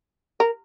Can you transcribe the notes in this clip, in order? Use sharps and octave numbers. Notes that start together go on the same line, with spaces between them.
A#4